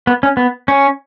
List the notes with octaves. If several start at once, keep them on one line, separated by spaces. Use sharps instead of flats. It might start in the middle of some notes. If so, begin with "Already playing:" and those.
B3
C#4
B3
C#4